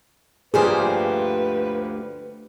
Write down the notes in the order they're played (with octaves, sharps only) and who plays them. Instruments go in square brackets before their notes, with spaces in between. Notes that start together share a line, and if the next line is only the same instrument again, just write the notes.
[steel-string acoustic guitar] D2 G4 C5 [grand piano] G2 F3 A#3 [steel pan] G#4 [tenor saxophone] B4